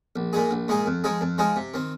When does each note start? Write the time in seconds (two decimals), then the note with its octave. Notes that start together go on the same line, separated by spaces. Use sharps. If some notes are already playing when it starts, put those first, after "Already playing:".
0.16 A#1
0.33 A#2 G#3 D#4 G#4
0.51 A#1
0.68 A#2 G#3 D#4 G#4
0.86 F2
1.04 F3 G#3 D#4 G#4
1.21 F2
1.38 F3 G#3 D#4 G#4
1.56 C3
1.74 D#3 C4